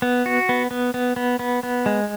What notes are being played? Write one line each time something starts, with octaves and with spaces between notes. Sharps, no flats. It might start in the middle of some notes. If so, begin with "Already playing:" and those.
B3
F#4
B3
B3
B3
B3
B3
B3
G#3